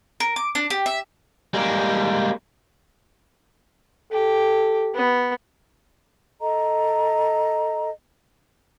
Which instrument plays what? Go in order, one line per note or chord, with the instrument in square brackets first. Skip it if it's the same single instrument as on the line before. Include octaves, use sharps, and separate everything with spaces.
[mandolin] A#4
D6
D4
G4
E5
[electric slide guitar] G3 G#3 A#3
[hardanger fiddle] G4 [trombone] A4
[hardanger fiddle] B3
[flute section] A4 D#5 A#5